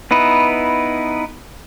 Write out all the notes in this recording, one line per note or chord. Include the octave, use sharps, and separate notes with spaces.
B3 D#4 E4 B4